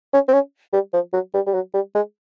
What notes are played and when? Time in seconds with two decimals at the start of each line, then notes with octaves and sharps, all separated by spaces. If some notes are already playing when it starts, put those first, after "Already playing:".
0.13 C#4
0.29 C4
0.33 C#4
0.73 G3
0.94 F3
1.13 F#3
1.34 G3
1.47 G3
1.54 F#3
1.74 G3
1.95 G#3